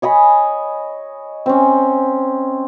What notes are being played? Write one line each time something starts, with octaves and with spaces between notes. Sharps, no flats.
C#5 D#5 G#5 B5
C4 C#4